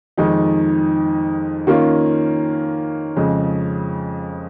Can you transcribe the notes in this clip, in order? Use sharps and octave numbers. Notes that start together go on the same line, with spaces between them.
F2 D#3 G#3 D#4
D#3 A#3 C#4 F4
F2 C#3 G#3